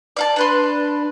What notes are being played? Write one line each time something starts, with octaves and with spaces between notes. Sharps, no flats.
D5 F5 A5
D4 B4 C6